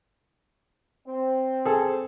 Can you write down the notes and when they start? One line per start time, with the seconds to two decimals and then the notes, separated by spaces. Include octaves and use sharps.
1.07 C4
1.65 G#4 A4